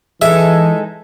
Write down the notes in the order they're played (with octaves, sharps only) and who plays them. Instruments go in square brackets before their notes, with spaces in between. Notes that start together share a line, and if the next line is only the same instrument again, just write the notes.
[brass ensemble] E3 [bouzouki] G#3 D#4 A4 [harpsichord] E5